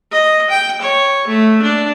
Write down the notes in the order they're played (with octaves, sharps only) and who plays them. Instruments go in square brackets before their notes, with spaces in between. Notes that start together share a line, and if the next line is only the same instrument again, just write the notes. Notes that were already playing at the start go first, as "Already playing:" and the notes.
[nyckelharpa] D#5
G5
C#5
A3
D4